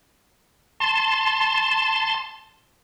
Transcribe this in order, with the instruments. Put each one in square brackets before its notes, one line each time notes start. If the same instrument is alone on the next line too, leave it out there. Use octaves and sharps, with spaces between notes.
[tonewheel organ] A5 C6